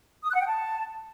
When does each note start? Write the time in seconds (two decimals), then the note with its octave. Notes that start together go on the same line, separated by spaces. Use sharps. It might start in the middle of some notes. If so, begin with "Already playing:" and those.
0.23 D#6
0.28 F#6
0.34 F#5
0.40 G5
0.46 A5